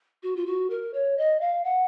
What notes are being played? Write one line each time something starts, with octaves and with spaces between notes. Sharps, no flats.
F#4
F4
F#4
A#4
C#5
D#5
F5
F#5